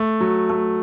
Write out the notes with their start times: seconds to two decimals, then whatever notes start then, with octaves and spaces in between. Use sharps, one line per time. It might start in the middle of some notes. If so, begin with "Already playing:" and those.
Already playing: A3
0.20 F#3
0.49 A3